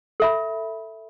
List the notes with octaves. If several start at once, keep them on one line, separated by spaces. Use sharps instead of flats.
A4 E5 B5